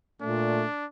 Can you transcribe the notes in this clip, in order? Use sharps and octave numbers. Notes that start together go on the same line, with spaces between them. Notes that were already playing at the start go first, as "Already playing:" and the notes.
A#2 A3 D4